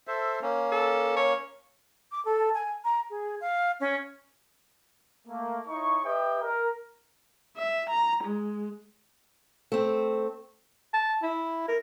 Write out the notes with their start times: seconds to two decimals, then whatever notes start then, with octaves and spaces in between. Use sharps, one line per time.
0.07 A4 C5 E5
0.42 A#3 C#4
0.72 A4
1.17 C#5
2.12 D6
2.25 A4
2.54 G#5
2.84 A#5
3.10 G#4
3.41 F5
3.80 C#4
5.28 A3 A#3
5.67 D#4 E4 C#5 C#6
6.05 G4 B4 D#5 E5 G5
6.42 A#4
7.57 E5
7.90 A#5
8.24 G#3
9.72 A3 C4
10.94 A5
11.23 E4
11.68 A#4